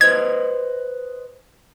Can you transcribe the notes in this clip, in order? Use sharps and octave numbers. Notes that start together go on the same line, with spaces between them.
B4 C5 D#5 G#6